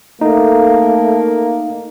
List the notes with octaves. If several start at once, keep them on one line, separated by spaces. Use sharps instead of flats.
A3 A#3 D#4